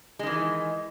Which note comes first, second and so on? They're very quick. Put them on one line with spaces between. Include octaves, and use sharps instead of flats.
G#3 D#3 E3